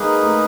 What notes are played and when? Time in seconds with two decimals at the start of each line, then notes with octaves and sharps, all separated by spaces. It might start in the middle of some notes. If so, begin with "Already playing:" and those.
Already playing: G#3 A#3 D#4 G#4 B4
0.23 A3